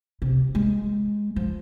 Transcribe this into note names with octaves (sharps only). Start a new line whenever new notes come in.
C3
G#3
F3